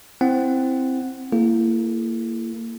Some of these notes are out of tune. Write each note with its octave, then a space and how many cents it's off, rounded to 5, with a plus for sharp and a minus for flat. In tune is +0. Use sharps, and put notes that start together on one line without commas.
C4 +0 E4 +0 F#5 +0
A#3 -20 E4 +30 G#4 +30